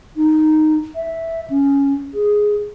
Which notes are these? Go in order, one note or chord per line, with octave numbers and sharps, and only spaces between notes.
D#4
E5
C#4
G#4